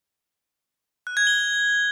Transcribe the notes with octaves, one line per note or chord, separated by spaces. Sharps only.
F#6
G#6
G7